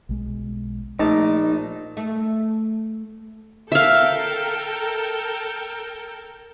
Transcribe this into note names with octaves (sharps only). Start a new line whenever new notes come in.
B1 G#3
A#1 A3 D#4 A5 D6
A3
A4 A#4 E5 F5 G5